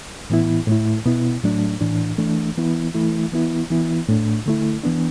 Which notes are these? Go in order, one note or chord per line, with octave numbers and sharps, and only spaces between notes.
A2 E3 B3 E4
A2 A3 E4
B2 B3 E4
A2 F#3 A3 D4
A2 E3 D4
E3 A3 D4
E3 B3 E4
E3 A3 E4
E3 B3 E4
E3 B3 E4
A2 A3 D4
D3 A3 E4
E3 B3 D4